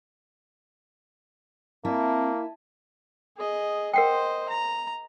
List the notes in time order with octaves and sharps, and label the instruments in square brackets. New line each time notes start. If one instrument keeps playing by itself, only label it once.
[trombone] A#3 [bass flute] C4 [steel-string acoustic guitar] E4 [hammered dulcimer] D#5 G#5 A5
[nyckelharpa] G#4 D#5
[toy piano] A#4 F#5 G5 [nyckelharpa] C5 D#5
[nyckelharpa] A#5